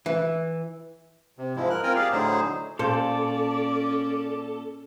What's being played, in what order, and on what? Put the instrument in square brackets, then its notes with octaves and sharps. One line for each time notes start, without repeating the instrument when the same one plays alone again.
[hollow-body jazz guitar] E3
[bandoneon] C3
G#2 F3 G#3 E4
A#4 F#6
C4 F4 A#4 G5 G#5 A#5
G4 G#4 D5 F5
A2 D3 F#3 D#4 G#4 C5
[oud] A#2 C5 [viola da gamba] C#4 [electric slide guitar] A4 [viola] D5